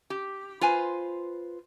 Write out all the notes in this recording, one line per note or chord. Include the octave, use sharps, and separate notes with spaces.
G4
F4 B4 C5 G#5